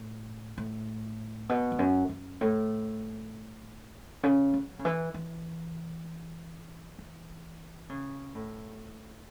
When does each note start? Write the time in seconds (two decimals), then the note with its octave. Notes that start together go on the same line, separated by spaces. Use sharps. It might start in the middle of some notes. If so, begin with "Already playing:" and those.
Already playing: A2
0.58 A2
1.49 B2
1.72 E2
1.79 F#2
2.09 F#2
2.41 A2
4.23 C#3
4.54 F#3
4.79 C#3
4.85 E3
5.14 E3
6.99 E3
7.89 C#3
8.35 A2